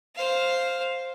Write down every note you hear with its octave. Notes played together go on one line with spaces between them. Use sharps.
C5 F5